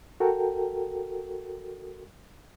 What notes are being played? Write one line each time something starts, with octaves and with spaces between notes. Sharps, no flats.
F#4 A4 A#4 G5